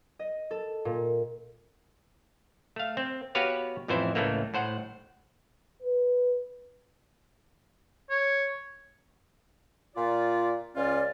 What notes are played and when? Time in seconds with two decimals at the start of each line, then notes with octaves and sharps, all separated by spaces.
0.19 D#5
0.51 A4
0.85 A#2
2.76 A3 F5
2.97 C4
3.35 B3 F#4 G4 B4 C#5 F5
3.88 A1 F2 E3 E4 C5
4.15 C#2 A2 E3 A3 A#3
4.54 A2 C5 F#5
5.82 B4
8.10 C#5
9.95 A#2 F4 D5
10.75 C#2 C#4 F4 D5